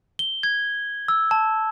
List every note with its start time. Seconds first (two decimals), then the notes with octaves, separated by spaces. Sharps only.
0.19 G7
0.43 G#6
1.08 E6
1.31 A5